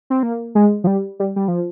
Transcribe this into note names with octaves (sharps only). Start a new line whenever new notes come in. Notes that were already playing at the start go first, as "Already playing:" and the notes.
C4
A#3
G#3
F3
G3
G3
G3
F3